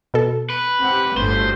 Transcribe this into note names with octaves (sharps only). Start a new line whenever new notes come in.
B2 A4
B4
C4 G4 F#5
G1 D2 A2 C5